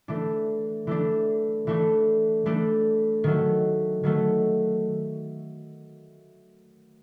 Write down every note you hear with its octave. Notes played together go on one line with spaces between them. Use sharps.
E3 A3 D4
E3 A3 D4
E3 A3 D4
E3 A3 D4
D#3 F#3 A3
D#3 F#3 A3